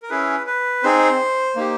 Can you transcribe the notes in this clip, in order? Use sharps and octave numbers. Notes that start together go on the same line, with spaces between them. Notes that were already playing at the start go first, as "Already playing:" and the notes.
A#4
C#4 E4 G#4 B4
B4
C4 D#4 G#4 C5
A#3 D#4 G4